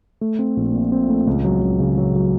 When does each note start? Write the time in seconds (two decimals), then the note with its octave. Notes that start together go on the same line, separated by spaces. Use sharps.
0.21 A3
0.39 C4
0.57 A#1
0.74 A#2
0.92 C4
1.09 A3
1.27 C#2
1.45 F#3
1.62 C#2
1.80 C#3
1.98 F#3
2.16 F#3